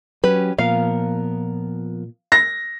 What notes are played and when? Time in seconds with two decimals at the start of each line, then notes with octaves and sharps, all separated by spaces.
0.24 F#3 C#4 G4 B4
0.58 A#2 F3 B3 A#4 F5
2.32 A#6